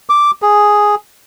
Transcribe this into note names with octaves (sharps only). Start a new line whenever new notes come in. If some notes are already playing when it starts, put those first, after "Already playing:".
D6
G#4